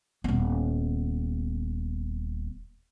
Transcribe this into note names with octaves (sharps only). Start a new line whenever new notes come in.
D#1 B3